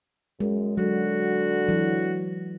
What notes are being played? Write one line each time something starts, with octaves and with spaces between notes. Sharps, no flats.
F#2 G#3
D3 F#3 F#4
E3 F#3